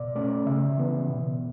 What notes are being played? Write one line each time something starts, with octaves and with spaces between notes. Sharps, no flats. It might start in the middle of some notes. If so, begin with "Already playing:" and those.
Already playing: B2 D5
A3 C#4 D5
C#3 E5
E3 B3
B2